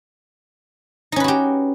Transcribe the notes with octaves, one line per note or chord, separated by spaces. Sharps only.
C#4 D#4 F#4 G4 B4